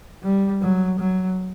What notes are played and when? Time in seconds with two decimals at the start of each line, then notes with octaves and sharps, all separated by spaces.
0.23 G3
0.62 F#3
0.99 F#3